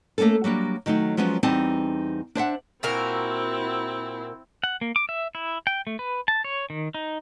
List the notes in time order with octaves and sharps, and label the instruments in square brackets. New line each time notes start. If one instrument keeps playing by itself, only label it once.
[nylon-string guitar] A3 A#3 C4 C#4 A4
F#3 G3 A#3 D4
D#3 F#3 A3 D#4
F3 F#3 G#3 B3 C#4 F4
E2 G3 C4 D#4 A5
D4 C5 E5 F#5
[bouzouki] A#2 F#4 A#4 [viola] C4 E4
[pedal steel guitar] F#5
A#3
D6
E5
E4
G5
A3
B4
A5
C#5
D#3
D#4